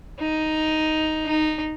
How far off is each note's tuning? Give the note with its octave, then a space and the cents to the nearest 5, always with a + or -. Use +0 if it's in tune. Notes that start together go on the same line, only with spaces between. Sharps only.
D#4 +5
D#4 -10